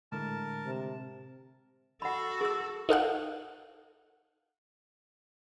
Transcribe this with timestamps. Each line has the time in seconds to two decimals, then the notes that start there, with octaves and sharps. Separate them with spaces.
0.12 A2 D3 G#3 A3 A#4 A5
0.65 C3
2.02 F#4 A4 F#5 B5
2.41 G#4 E6
2.89 D#4 A4 F5 F#5